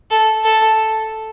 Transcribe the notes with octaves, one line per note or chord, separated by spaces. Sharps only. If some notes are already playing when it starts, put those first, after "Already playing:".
A4
A4